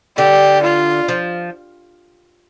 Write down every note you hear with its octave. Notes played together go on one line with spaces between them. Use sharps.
D3 G4
F4
F3